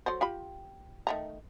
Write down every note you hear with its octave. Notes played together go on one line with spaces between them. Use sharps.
F#3 A4 C5
F4 G4 B5
D#3 A3 A#5